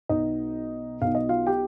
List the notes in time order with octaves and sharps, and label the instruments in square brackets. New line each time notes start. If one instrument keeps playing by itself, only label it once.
[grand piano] B1 B2 B3 D#4 D#5
B1 B2 B3 D#4 F5
D#5
F4 F5
G4 G5